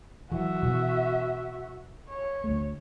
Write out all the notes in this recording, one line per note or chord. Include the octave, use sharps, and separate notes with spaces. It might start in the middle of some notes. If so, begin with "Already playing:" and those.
E3 F#3 F#4 E5
B2 E3
C#5
D2 A3